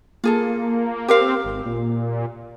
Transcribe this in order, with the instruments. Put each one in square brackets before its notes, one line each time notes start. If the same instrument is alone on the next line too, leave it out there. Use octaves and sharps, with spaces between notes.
[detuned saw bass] A#3 [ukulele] F4 G#4 A4
[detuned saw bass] C4 [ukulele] G4 A#4 F5
[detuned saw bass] G#1
A#2